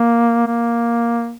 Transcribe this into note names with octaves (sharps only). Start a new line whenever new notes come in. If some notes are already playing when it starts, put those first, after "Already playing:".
Already playing: A#3
A#3